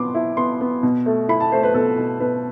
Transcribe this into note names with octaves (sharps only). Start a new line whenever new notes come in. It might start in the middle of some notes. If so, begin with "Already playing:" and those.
Already playing: B2 B3 C6 D6
E4
B3 C6
B3
B2
A3
E4 B5
A5
A3 C5
B4
B2 A4
B2
B2 B4